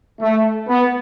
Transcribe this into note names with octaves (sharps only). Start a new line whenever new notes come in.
A3
B3